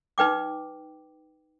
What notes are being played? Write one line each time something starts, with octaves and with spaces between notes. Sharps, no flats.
D#4 B4 G5 D6